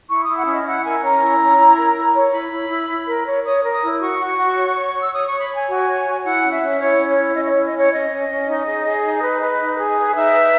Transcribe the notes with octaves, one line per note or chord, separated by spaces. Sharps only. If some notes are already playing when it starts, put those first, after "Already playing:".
E4 C#6
E4 D#6
F#5
C#4
D#5
E4 F#5
A#4 G#5
C#4 A#5
E4
C#4
E4
A#4
E4
C#5
E4 B5
E4
E4
E4
A#4
C#5
C#5 D#6
A#4
D#6
E4
F#4 C#6
F#4
F#4
C#5
C#5
C#5
E6
C#5 D#6
C#6
C#5
B5
C#5
G#5
F#4
C#5
F#4
E4 F#5
C#4
E5
C#4
E4 C#5
C#4
C#5
E4
C#4 D#5
D#5
E4 C#5
D#5
C#4 C#5
C#4 D#5
C#4
C#4
D#4
G#4
G#4
D#4
B4
B4
D#4
G#4
B4
D#4 E5
B4